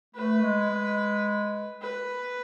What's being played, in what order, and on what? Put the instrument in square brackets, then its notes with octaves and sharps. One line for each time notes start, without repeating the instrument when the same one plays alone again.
[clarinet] A3 [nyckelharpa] B4
[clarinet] G#3
G#3
[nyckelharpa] B4